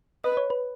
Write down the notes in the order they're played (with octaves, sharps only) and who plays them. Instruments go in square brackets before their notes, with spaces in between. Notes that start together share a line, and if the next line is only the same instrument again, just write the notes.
[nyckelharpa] B4 [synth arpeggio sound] D#5
[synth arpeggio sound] C#5
B4